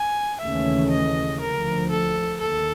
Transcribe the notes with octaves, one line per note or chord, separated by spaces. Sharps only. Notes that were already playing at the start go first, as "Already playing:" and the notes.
Already playing: G#5
D#2 C#3 E3 A3 C#4 E5
D#5
D2 D3 F3 A#4
A4
D#2 D#3 A4